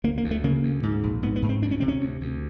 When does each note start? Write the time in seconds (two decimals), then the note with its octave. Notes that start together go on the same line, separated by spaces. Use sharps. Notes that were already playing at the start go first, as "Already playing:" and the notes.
0.04 D2 A#3
0.18 A#3
0.24 D2
0.31 A3
0.44 C#3 A#3
0.63 D2
0.83 G#2
1.03 A#1
1.23 G#2 B3
1.36 B3
1.42 G#2
1.49 C4
1.62 D2 D4
1.71 C#4
1.80 C3 C4
1.88 C#4
2.01 D2
2.21 D2